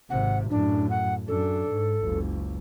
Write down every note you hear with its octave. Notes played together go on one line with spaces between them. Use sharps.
G#1 C3 F#5
F#2 A2 D4
F#5
F#2 D4 A4
G#2
F#1 C#2